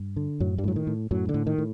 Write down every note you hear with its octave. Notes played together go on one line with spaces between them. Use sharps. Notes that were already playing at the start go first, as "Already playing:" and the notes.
Already playing: G2
D3
F#2 A2 F#3
G2 G3
A2 F#3
D#3
A2
F#2 A2 F#3
D3
A2
D#3
A2